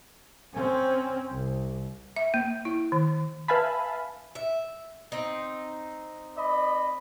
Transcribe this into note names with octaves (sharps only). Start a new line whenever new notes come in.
C4 C#4
C2
E5
A#3
E4
D#3
B4 E5 F5 G#5 A5 B5
E5
C4 D#4
D5 D#5 B5